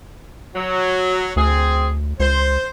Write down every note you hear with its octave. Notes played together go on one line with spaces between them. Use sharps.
F#3
D2 C4 G#4
C#2 C5